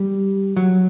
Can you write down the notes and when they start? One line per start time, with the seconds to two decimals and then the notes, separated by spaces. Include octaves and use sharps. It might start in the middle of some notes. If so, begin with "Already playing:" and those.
Already playing: G3
0.57 F#3